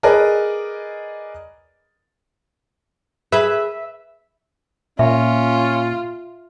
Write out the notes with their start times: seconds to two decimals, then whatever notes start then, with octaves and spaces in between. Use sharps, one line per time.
0.03 G#4 A#4 B4 D5 D#5
3.32 G#4 B4 E5
4.99 A#2 C#4 F4 E5